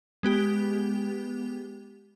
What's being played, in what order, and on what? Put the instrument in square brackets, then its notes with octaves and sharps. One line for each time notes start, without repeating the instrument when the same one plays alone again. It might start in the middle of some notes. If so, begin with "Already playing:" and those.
[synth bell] G#3 B3 G4